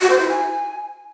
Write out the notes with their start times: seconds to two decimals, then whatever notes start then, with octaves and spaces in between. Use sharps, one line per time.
0.01 F#4
0.10 C5
0.19 E4
0.28 G#5